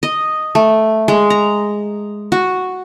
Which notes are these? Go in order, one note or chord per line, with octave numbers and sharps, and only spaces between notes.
D#5
A3
G#3
A#5
F#4